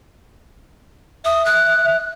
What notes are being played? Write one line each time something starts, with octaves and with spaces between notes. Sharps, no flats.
E5 D#6
F#6